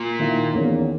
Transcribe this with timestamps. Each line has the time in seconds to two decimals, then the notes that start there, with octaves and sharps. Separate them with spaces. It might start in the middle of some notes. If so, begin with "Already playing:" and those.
Already playing: A#2
0.19 D#3 A#3 E4
0.53 E2 D#3 A#3 C#4